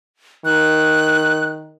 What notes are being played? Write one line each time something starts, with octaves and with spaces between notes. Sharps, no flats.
D#3 F#6